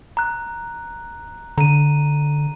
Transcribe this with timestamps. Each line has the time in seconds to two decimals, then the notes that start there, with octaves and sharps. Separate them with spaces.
0.17 A#5 F#6
1.58 D3 A#5 D#7